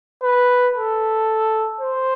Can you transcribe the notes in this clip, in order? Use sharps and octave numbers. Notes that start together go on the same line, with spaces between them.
B4
A4
C5